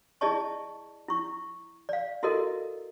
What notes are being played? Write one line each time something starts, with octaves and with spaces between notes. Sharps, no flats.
E4 G#4 D5 D#5 A5 C#6
E4 C#6
D5 F5
E4 F#4 A4 A#4 D#5